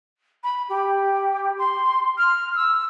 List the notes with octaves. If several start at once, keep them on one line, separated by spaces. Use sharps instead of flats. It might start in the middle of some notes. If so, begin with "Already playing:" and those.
B5
G4
C6
F6
E6